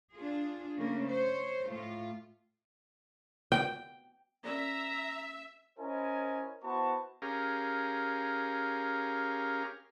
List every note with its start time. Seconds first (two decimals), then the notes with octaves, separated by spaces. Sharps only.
0.13 D4 F4 G#4
0.78 C#3 A3 A#3
1.10 C5 C#5
1.69 A2 A3 F4
3.52 G5
4.45 C#4 A#4 D5 E5 A#5
5.79 C#4 E4 A#4 C5 D#5 G#5
6.63 B3 E4 F#4 C5 A5 C#6
7.22 C#4 G4 G#4 A#4 F5